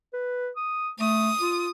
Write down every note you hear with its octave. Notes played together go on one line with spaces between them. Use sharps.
B4
D#6
A3 D#6
F4